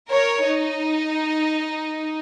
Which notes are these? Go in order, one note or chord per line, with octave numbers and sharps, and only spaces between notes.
A#4 C#5
D#4